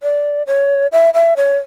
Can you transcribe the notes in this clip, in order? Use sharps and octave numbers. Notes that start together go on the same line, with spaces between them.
D5
C#5
E5
E5
C#5